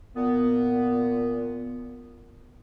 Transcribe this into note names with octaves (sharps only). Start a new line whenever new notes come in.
A#2 B3